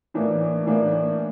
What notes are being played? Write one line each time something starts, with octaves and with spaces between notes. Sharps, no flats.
A2 E3 A#3 D4
A2 E3 A#3 D4